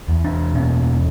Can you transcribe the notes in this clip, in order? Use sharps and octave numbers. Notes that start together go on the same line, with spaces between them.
E2
D4
B2 C#4